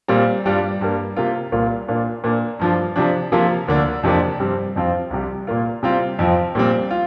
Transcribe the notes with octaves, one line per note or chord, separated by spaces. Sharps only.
A#2 G3 C4 F4
G2 G3 D4 F4
G2 G3 A#3
C3 A#3 F4
C2 A#2 A#3 F4
A#2 A#3 D4 F4
A#2 A#3 D4
G2 F3 D4 F4
C3 F3 D4
C3 F3 A#3 F4
D2 D3 A#3 D4
F2 C3 F3 A#3 D4
G2 G3 C4
F2 F3 C4 F4
C2 C3 G3
A#2 A#3 F4
C3 G3 C4 F4
F2 F3 C4 F4
A#2 G3 C4
F4